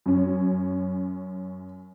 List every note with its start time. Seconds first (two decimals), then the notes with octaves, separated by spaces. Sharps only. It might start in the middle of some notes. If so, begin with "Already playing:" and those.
0.06 F#2 C#4